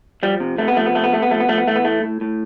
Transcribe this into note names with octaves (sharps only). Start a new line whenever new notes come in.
F3 G3
C3
C3 A3
B3
F3 A3
B3
C3 A3
B3
C3 A3
B3
F3 A3
B3
F3 A3
B3
E3 A3
B3
A2 A3
A2
A2